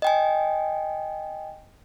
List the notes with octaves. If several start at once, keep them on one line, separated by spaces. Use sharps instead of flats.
D#5 G5 G#5